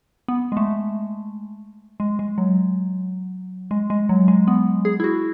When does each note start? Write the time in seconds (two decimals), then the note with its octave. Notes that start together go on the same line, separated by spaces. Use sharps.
0.28 B3
0.52 G#3
0.57 A3
2.00 G#3
2.19 G#3
2.38 F#3
3.71 G#3
3.90 G#3
4.09 F#3
4.28 G#3
4.48 B3
4.85 G#4
5.00 E4
5.04 F#4